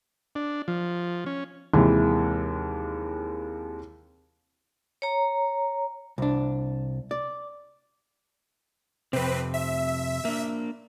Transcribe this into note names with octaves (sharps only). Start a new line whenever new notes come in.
D4
F3
C#4
D#2 C3 E3 G#3
C#5 A#5
C2 D4
D5
F2 C3 C4 B4
E5
A#3 D4